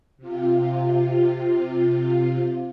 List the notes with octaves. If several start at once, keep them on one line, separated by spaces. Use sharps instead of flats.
C3 F4